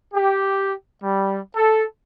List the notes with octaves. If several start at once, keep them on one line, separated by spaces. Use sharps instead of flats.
G4
G3
A4